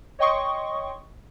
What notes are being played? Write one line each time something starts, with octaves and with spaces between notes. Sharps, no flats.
C#5 D#5 G5 C6 C#6 D#6